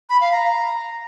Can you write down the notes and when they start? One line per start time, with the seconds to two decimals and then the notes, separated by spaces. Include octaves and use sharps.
0.09 B5
0.21 F5
0.32 A#5